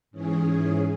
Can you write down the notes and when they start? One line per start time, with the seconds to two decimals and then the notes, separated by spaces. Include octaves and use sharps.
0.11 G#2 E3 C#4 G#4